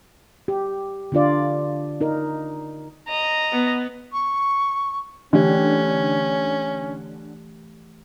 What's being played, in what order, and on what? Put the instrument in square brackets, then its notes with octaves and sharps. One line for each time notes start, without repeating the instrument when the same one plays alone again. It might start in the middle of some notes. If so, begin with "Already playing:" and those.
[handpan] G4
D3 D4 F4 D5
D#4 A#4
[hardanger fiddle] D#5 A#5
[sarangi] B3
[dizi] C#6
[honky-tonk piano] D3 [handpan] E3 A3 G4 [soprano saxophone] C#4